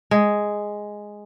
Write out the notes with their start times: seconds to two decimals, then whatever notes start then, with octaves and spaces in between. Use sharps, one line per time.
0.11 G#3